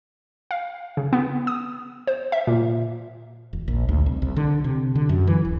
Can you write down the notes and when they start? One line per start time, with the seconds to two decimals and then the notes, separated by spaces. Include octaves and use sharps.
0.51 F5
0.97 C#3
1.13 B3
1.47 D#6
2.07 C5
2.32 E5
2.47 A#2
3.53 E1
3.68 A#1
3.89 D2
4.06 C2
4.22 C2
4.36 D3
4.64 C3
4.95 D3
5.09 F#2
5.27 E3
5.45 D1